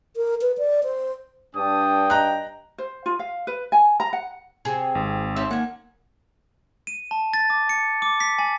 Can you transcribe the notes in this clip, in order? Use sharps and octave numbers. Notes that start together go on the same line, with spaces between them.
A#4
B4
D5
C5
G2 D4 G5 D#6
D#5 A#5 F#6
C5
F4
F5
B4
G#5
A#5
F#5
C3 G#4
G#1
D#3 C4 C#4 G4 E5
A#3 F#5 G#5
D#7
A5
A6
D6
C#7
D6
B6
G#5